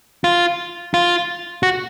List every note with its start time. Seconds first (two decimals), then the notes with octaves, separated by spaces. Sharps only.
0.24 F4
0.94 F4
1.63 F#4